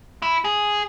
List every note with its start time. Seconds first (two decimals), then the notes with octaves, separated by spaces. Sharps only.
0.22 E4
0.45 G#4